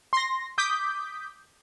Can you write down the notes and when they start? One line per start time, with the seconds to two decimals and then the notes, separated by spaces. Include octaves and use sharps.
0.13 C6 A#6
0.58 D6 D#6 G6 B6